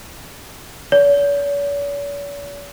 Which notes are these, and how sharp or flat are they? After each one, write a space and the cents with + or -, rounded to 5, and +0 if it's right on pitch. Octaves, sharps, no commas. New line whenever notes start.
C#5 +45